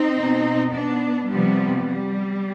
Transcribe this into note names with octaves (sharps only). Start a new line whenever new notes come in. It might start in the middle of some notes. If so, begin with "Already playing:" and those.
Already playing: C4 D#4
B2
B3 D4
C3 F3 G3 B3
G3